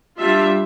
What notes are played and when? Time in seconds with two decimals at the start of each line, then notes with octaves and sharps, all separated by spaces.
0.18 G3 D4 F4 E5